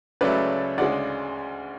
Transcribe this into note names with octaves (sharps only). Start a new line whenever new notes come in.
C#2 C#3 F#3 A3 B4 D5
D2 C#3 G#3 D5 F#5